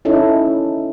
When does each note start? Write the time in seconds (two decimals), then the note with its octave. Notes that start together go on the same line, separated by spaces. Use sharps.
0.05 C#4 D#4 E4 A4